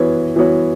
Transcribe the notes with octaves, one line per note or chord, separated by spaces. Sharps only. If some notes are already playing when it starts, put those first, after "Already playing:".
Already playing: E3 B3 F#4 C#5
E3 B3 F#4 C#5